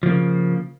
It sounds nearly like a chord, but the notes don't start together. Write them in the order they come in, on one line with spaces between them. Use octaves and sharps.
F3 A#3 C#3